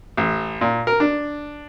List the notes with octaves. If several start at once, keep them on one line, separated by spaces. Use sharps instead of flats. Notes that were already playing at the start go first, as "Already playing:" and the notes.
A1
A#2
A#4
D4